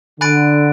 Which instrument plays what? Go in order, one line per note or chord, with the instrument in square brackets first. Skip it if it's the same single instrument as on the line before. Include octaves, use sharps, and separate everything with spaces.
[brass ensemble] D3 [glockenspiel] G#5 B5 F#6 A6 D7